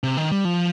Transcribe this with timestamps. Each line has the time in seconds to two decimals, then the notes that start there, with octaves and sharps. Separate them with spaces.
0.03 C3
0.17 D#3
0.32 G3
0.45 F3